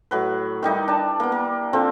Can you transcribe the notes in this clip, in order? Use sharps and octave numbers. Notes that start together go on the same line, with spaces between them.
A2 F#3 B4
D#3 G3 D#4 E4
D4 A5
A#3 B3
A#3
D3 F3 C4